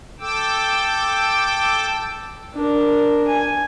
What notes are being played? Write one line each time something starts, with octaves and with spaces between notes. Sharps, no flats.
A4 G5 D6 E6
D4 A#4
G#5